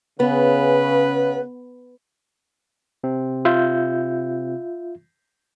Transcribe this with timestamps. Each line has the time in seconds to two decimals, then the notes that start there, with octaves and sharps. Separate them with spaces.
0.20 C#3 B3 B4
3.04 C3 C4
3.45 F4 E5 G6